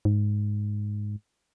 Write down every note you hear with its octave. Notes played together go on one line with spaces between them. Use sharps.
G#2